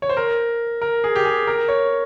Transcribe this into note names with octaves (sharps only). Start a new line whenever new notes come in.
C#5
C5
A#4
A#4
G#4
G4
G#4
A#4
C#5